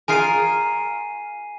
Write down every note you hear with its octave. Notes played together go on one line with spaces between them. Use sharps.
F4 G#4 A#4 G#5 C7 D#7